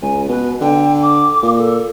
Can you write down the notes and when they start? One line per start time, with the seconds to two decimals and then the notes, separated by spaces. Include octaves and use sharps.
0.02 C#2 G#5
0.29 B2 B4
0.61 D3 G5
1.02 D6
1.43 A#2
1.57 A4